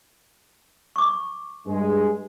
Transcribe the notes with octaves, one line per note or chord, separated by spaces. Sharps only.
C#6 D6
G2 G#3